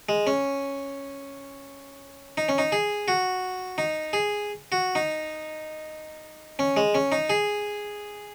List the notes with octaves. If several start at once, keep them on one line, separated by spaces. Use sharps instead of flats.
G#3
C#4
D#4
C#4
D#4
G#4
F#4
D#4
G#4
F#4
D#4
C#4
G#3
C#4
D#4
G#4